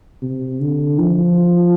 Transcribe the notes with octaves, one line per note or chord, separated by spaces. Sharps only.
C3
D3
F3